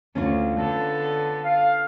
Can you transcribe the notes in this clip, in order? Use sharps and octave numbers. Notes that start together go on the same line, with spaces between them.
D2 C#4 D4 F4
D3 B3 A4
F5